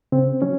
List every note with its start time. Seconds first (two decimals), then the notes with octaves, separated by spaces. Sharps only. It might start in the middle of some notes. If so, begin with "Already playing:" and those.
0.12 C#3 C4
0.42 F#3 C#4